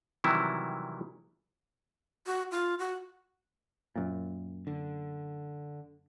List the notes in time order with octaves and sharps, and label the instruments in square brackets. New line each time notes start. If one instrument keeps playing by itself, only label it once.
[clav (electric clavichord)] C3 D#3 E3 F#3 G3 E4
[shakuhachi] F#4
F4
F#4
[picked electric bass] F#2 A#2
[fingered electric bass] D3